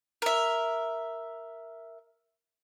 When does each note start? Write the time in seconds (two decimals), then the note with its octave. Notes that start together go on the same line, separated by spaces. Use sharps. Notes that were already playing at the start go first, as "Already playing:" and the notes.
0.22 A#4 E5